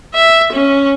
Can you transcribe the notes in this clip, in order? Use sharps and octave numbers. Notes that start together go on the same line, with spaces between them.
E5
C#4